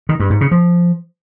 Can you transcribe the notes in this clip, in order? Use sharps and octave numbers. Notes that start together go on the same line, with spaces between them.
D#3
G2
G#2
C#3
F3